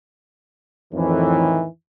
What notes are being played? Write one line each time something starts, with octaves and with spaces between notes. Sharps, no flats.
F2 A2 D#3 E3